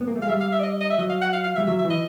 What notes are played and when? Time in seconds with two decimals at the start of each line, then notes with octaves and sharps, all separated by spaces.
0.01 B3
0.08 A#3
0.16 A3
0.22 G#3 F5
0.29 G3 E5
0.41 F5
0.53 E5
0.60 D5
0.63 D#5
0.81 D#5
0.90 E5
0.98 F#3 D#5
1.10 F5
1.22 F#5
1.33 F5
1.44 F5
1.56 G3 E5
1.67 F#3 E5
1.79 E5
1.85 E3
1.90 D#5